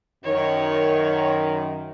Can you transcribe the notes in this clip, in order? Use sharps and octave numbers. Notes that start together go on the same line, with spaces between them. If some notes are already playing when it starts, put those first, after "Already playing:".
F#2 D#3 C#5